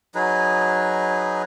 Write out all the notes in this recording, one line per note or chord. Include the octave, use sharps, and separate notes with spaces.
F#3 D#4 G#4 B4